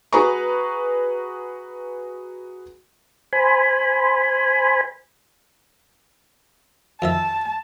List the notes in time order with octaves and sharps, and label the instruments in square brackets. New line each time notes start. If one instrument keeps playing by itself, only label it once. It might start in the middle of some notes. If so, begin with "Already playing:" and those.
[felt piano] F#4 G#4 B4 G#5 A#5 C#6
[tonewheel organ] C5 G#5 B5
[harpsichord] F2 D#3 E5 [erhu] A5